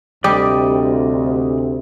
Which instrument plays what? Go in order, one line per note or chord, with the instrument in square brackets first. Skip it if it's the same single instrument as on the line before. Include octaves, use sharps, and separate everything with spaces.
[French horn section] D2 C3 [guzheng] G3 [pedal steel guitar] D5 D#5 D6